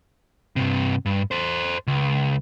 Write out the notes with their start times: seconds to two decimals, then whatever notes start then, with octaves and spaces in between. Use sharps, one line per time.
0.56 G2 C3
1.06 G2
1.31 A4 C5
1.87 C#2